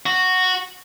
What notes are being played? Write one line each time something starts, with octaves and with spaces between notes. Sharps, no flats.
F#4